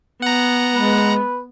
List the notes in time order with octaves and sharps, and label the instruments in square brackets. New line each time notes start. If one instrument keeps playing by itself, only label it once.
[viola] B3 [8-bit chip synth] F#5 A#5
[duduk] G#3 [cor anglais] B4